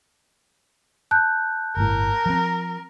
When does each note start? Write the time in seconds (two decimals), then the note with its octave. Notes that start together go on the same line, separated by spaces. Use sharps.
1.11 A5 F#6 G6
1.77 G1 A2 A#4
2.26 F3 C4